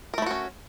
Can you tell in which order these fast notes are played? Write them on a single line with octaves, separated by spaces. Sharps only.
A#4 A3 E4 F#4 C#4